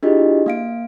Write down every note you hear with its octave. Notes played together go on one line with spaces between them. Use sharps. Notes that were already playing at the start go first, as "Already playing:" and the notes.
D4 E4 F4 G4 G#4 D#5
A#3 F5 D7